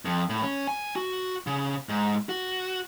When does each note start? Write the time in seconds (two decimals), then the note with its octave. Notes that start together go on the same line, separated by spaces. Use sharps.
0.05 F2
0.29 A2
0.43 C#4
0.67 G#5
0.96 F#4
1.47 C#3
1.89 G#2
2.29 F#4